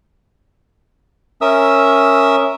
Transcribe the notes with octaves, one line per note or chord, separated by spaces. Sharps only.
C#4 A#4 E5 D#6 E6